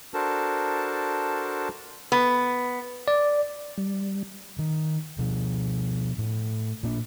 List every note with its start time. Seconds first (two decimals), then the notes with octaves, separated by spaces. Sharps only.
0.14 D4 F#4 A4 A#4 C5 A5
2.12 B3
3.08 D5
3.78 G3
4.59 D#3
5.18 B2 F3
6.18 A2
6.83 A#2 A#3 D4